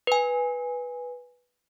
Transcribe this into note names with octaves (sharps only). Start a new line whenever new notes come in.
B4 G#5